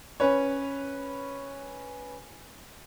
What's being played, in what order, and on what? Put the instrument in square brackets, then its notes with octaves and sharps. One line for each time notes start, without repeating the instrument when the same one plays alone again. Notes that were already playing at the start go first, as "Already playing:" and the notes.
[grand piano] C#4 B4 C#5